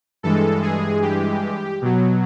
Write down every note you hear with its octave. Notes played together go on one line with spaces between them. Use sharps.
G2 E3 G#3 A4
G#4
G4
B2 F#3